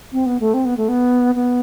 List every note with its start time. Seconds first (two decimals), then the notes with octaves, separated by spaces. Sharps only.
0.12 C4
0.26 B3
0.40 A3
0.54 C4
0.65 B3
0.77 A3
0.89 B3
1.35 B3